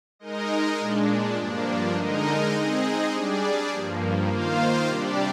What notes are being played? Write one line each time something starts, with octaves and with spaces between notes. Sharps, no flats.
G#3 D#4 A#4 D#5
A#2 G#3 D4
G2 F3 A#3 D4
D3 G#3 D#4 A#4 D#5
G#3 C4 D#4 G#4 D#5
G3 D4 G#4 D5
G2 F3 A#3
D#3 A#3 F4 C5 F5
C3 G3 D4 G4 D5